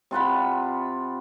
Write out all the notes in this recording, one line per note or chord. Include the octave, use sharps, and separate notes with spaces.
C3 F4 F#5 B5